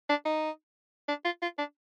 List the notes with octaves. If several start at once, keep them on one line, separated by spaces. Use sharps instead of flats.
D4
D#4
D4
F4
F4
D4